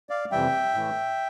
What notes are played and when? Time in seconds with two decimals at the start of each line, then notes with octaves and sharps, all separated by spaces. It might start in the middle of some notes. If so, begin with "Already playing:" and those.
0.09 D5 F5
0.31 F2 C3 E3 G3 E5 G5
0.74 A2 E3 A3